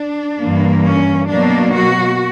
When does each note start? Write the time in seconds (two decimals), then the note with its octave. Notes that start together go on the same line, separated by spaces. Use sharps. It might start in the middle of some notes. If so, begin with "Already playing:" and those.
Already playing: D4
0.39 G2 E3 A#3
0.85 C#4
1.29 B2 F#3 A#3 D4
1.76 F#4